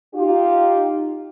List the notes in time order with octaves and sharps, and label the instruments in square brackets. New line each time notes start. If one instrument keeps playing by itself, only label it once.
[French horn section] D#4 F4 G4